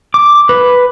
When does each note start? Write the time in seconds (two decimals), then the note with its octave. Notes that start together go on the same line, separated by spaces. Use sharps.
0.14 D6
0.49 B4